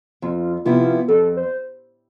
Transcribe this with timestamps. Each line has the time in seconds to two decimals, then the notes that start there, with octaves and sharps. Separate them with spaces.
0.22 F2 F4
0.65 C3 F3 B3 E4 F4
1.08 F2 A4
1.37 C5